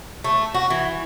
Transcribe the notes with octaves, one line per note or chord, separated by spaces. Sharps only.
A3
F#4
E3